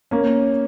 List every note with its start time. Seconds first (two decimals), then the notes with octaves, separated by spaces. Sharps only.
0.11 A#3 C#4